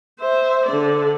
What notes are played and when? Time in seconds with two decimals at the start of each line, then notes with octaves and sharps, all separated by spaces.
0.20 C5 E5
0.66 D3 D5